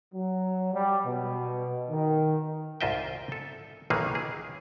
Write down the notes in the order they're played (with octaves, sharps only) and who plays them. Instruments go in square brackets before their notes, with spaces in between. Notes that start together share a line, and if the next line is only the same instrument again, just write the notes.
[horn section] F#3
G3
B2
D#3
[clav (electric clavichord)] C2 G#2 F4 D#5 E5 G5
A4
B1 D#3 E3 A#3 G#4 F5
G#4